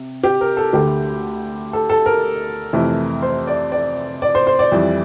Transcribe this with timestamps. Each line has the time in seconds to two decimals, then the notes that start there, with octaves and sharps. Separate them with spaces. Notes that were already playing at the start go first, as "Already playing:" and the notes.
Already playing: C3
0.24 G4
0.41 A#4
0.57 A4
0.73 D2 D3 A3 G4
1.73 A4
1.90 A4
2.06 A#4
2.73 F2 C3 E3 A3
3.22 C5
3.47 D5
3.72 D5
4.22 D5
4.35 C5
4.47 C5
4.59 D5
4.72 F2 E3 G3